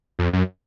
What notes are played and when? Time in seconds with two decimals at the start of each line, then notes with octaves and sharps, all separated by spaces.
0.19 F2
0.33 F#2